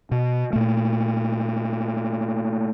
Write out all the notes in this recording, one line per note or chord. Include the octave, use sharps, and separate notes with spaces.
B2
A#2 A3